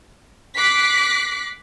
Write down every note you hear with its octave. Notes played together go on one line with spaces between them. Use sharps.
D6 F#6 B6 C7